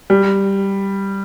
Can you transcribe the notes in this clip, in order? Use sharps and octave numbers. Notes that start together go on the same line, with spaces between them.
G3